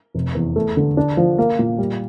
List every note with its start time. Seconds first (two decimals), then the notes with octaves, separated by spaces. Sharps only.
0.14 F1
0.35 E2
0.56 A3
0.77 D3
0.97 D4
1.17 F3
1.38 A#3
1.59 A#2
1.78 G3